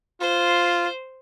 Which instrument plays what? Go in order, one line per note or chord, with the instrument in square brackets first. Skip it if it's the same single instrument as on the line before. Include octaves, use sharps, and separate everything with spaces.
[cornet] F4 [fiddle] C5